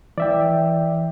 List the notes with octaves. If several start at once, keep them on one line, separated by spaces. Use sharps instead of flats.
E3 D5 E5 G5